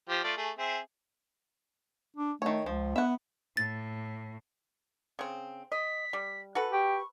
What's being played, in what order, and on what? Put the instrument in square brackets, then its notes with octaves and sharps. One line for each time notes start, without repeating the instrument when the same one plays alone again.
[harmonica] F3 G4
A3 F4 D5
A3 G#4
C4 G#4 E5
[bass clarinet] D4
[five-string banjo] D#3 C#5 [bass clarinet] A3
[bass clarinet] C#2 [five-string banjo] F3
[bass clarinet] B3 [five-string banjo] E5 F#5
[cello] A2 [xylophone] A6
[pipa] C#3 C4
[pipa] D#5 [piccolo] B6
[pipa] G3
F#4 A4 B4
[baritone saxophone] G4 [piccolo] C#6